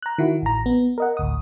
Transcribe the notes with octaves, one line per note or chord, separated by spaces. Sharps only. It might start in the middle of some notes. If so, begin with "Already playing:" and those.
A#5 F#6
D#3 E4 F#4
A1 A#5
B3
A#4 D#5 F#5
A1 D2 D#6